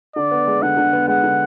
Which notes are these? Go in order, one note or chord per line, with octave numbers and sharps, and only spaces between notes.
D3 D5
B3
G#3
D3 F#5
D3
B3
G#3 F#5
D3